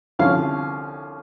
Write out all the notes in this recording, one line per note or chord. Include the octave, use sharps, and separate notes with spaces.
C2 D3 F3 C#4 F5